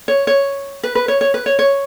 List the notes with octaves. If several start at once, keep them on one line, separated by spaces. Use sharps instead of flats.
C#5
C#5
B4
B4
C#5
C#5
B4
C#5
C#5